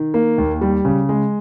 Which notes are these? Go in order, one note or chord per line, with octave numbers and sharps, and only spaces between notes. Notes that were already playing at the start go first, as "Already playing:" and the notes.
Already playing: D#3
A#3
D#2
G3
C#3
G#3